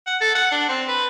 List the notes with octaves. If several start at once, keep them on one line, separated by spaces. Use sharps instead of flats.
F#5
A4
F#5
D4
C4
B4